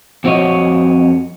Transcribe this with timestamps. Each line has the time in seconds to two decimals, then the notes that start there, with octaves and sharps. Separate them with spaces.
0.24 F2 C4 F#4 C#5 D#5